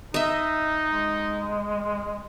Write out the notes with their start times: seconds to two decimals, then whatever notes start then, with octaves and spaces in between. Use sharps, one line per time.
0.14 D#4 D#5 E5
0.90 G#3